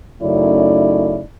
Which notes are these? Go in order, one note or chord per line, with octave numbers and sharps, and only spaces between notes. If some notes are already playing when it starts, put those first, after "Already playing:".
F#2 C#3 A3 D#4 E4 D5